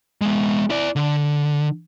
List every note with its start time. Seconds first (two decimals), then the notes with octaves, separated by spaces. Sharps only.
0.21 G#3 B3
0.70 E4 D5
0.96 D3